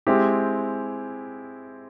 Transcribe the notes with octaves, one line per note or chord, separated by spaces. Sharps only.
G#3 C4 E4 G4